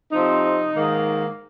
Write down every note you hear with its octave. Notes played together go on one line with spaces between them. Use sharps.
C3 F3 C4 D#4
G#2 D#3 A#3